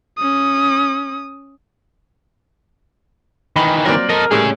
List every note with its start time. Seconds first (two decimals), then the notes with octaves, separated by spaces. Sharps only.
0.18 C#4 D#6
3.56 D#3 E3 B4 D#5 B5
3.85 F#3 A#3 C4 A#4 B4 D5
4.09 A4 A#4 D#5
4.31 A2 G3 G#3 C#4 G#4